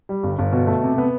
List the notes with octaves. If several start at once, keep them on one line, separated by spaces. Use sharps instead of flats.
G3
G1
G1
B2
A3
C3
B3